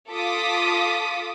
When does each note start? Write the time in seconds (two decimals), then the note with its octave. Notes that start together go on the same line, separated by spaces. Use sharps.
0.11 F4 A4 D6 D#6 B6